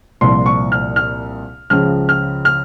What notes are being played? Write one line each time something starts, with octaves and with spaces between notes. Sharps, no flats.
C2 A#2 F3 C6
C#6
F6
F6
C#2 C#3 F3 F6
F6
F6